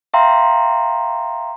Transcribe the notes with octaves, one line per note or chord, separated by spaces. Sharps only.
E5 F5 G5 A#5 C6